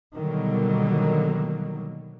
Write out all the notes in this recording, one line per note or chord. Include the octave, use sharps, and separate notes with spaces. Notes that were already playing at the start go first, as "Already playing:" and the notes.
B2 D3 D#3 F#3 G3 A#3